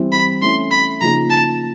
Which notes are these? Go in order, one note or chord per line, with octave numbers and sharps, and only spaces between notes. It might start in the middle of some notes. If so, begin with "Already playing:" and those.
Already playing: E3 G3 C4 E4
B5
E3 A3 C#4 E4 C6
B5
C#3 F3 A#3 D#4 G#4 A#5
A5